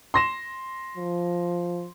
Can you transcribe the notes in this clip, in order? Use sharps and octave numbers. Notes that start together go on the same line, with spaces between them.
C6 A#6 E7
F3